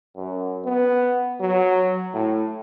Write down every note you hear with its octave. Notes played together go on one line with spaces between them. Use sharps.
F#2
B3
F#3
A2